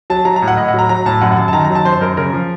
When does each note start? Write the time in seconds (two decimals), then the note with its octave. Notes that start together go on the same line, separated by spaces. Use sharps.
0.10 F#3 A5
0.25 F#3 A#5
0.36 A#5
0.42 A2
0.48 F#5
0.57 A2 D#5
0.68 F#5
0.74 F#3 A#5
0.89 F#3 A#5
1.06 A2 A5
1.21 F#2 F#5
1.32 F#5
1.37 F#2 A5
1.48 A5
1.53 D#3 A#5
1.65 A#5
1.70 F#3
1.75 A5
1.85 F#2 C5
2.01 F#2 A#4
2.17 C#3 A#4
2.33 F3